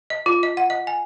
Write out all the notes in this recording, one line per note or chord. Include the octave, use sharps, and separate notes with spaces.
D#5
F4
D#5
F#5
D#5
G#5